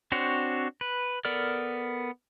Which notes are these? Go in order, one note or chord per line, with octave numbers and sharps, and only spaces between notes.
C4 D4 F#4 C5 C#5
B4
B3 A4 A#4 D5 F6